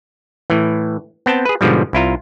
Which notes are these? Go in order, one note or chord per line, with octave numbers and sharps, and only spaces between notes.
A2 E3
B3 C4 G5 A5
G#4 B4
G#2 B2 D3 F3 G3
C2 E4 F4 A#5